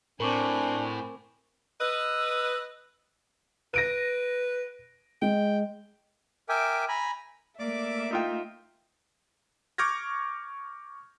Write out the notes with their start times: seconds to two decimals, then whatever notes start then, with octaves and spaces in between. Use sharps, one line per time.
0.20 A2 C4 D4 A#4 G#5 C#6 D6
1.80 B4 D#5 E6
3.74 B4 A#6 D7 D#7
5.22 G#3 G5
6.49 A#4 E5 G5 G#5 D6
6.88 G#5 A#5 B5
7.59 A3 A#3 D5 E5 D6
8.11 D#4 F4 G5
9.78 C#6 D6 F6 G6 G#6 A#6